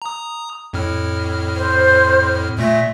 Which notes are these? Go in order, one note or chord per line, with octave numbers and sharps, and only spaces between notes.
A#5 D#6
F2 A2 F6
C5
A#2 A3 E5 A#6